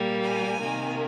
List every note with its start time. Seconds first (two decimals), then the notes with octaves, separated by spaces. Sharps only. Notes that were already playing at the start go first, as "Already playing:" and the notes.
Already playing: A#2 G3 A#3
0.24 G#5
0.61 C3 D#3 A#3